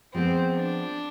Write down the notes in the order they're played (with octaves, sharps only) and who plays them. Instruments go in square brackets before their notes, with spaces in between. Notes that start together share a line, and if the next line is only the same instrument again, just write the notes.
[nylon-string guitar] F3 G#3 B3 [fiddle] C4
[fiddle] D4